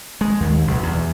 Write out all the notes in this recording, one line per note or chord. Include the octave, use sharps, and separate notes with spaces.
G#3
D#2
B1
E2